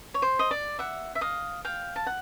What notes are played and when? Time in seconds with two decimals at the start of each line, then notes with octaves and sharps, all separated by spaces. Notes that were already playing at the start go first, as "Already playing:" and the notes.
0.14 C#5
0.22 C5
0.39 D#5
0.51 D5
0.79 E5 F#5
1.15 E5
1.21 D#5 F5
1.65 F5 G5
1.96 A5
2.06 F#5